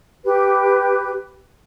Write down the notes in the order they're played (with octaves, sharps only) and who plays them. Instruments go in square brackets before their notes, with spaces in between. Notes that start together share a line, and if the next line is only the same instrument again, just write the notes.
[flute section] G4 B4